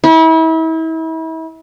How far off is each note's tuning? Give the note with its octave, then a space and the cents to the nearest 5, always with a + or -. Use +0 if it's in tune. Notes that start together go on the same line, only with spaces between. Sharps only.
E4 -35